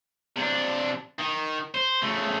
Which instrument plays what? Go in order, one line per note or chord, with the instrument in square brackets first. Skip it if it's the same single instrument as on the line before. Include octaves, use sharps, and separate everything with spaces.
[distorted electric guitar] C3 D4
D#3
C5
C#3 A3